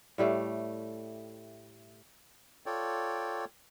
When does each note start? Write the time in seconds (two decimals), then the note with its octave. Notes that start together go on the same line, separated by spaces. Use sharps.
0.18 A2 G3 A3 F5
2.66 F4 A4 C#5 D5 G5